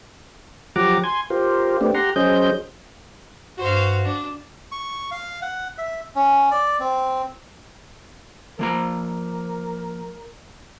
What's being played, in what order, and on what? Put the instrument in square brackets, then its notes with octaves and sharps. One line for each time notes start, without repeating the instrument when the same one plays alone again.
[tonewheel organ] F3 F#3 G4 F#5 A#5 D6
G#5 C6 G#6
F4 G4 A#4 C5
A3 B3 C4 D4 G4
G4 F#5 A#5 C6
F#3 C#4 G#4 C5 D#5 G6
[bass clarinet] G2 [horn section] F#4 [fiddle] C5 F5
[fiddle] D4
[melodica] C#6
F5
F#5
E5
C#4
D5
C4
[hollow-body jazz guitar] F3 A#3 A#5 [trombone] A#4